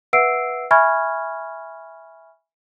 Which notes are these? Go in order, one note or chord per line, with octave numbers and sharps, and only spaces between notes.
B4 E5 F#5 E6 C7 D7
E5 G#5 B5 C#6 F6 G#6